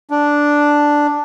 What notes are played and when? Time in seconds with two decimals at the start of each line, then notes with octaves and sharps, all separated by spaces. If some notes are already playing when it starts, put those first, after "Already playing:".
0.10 D4